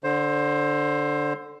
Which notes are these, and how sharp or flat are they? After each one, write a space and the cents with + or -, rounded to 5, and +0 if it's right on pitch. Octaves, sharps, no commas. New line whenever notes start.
D3 +0 C5 +20